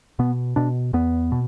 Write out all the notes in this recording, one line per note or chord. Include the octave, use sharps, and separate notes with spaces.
B2 B3
B2 D4
E2 B3
B2